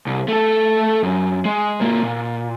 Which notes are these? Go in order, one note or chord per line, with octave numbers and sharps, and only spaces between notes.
C2
A3 A4
F#2
G#3
G#2 A#3
A#2